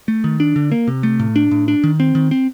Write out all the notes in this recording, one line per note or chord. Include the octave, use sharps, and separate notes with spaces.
A3
D#3
D4
D3
A#3
C3
A3
A2
D4
A2
D4
D#3
C4
D#3
C4